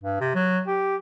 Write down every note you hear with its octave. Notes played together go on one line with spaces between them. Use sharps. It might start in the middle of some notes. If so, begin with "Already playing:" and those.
G2
C3
F#3
G4